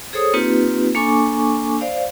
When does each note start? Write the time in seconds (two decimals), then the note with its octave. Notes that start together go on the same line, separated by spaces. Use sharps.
0.13 G#4 A4 C5 C#5 D#6
0.33 A#3 C4 D#4 F4 G4 B4
0.95 A#3 D4 A4 G#5 C#6 D6
1.81 C5 D5 F5